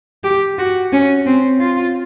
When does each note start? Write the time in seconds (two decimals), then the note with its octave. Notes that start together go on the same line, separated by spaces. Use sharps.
0.24 G4
0.58 F#4
0.93 C#4
1.27 C4
1.60 F4